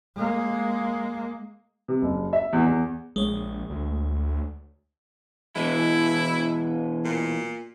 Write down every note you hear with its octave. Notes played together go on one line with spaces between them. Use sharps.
G#3 A#3
C3
F#1
E5
E2
E2
A#1 G#3 C#5
D2
B2 E3 G#3 E4
A#2